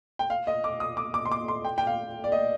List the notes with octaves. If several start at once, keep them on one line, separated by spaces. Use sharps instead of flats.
G5
F5
D#5
D6
D#6
D6
D6
C6
D6
C6
G5
G5
F5
D5
D#5